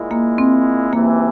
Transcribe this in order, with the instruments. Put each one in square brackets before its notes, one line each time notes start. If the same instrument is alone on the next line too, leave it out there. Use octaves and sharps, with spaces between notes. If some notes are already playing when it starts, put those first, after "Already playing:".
Already playing: [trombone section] A#2 G#3 E4
[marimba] A#3
C4
[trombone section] C#2 C3 E3 [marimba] A#3